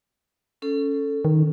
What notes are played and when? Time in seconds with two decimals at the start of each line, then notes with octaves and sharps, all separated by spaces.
0.62 C#4 A4
1.25 D#3